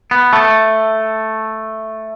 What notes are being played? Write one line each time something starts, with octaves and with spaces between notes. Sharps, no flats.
B3
A3